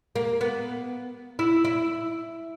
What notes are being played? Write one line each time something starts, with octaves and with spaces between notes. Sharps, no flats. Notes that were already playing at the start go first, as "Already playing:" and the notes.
A#3
B3
E4
E4